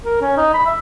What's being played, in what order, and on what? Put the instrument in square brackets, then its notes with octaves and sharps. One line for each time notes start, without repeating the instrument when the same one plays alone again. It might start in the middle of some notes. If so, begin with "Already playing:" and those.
[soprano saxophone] A#4
C#4
D#4
B5
E5